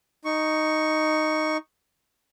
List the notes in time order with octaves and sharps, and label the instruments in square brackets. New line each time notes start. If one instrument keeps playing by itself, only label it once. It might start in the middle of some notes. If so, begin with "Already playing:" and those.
[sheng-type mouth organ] D#4 C#6